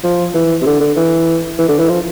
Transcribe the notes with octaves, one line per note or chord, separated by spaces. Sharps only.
F3
E3
C3
D3
D3
E3
E3
D3
E3
F3